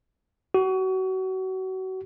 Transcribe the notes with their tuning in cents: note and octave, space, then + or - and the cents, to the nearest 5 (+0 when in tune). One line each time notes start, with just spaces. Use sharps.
F#4 +30